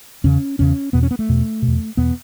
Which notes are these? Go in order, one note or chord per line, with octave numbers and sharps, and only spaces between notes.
E2 C#3 C#4
E2 C#3 C#4
E2 B2 B3
C#4
B3
A3
E2 B2
B2
E2
E2 B2 B3